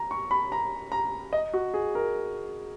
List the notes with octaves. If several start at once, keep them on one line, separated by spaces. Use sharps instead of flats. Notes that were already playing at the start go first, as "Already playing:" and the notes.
Already playing: A#5
C#6
B5
A#5
A#5
D#5
F#4
G#4
A#4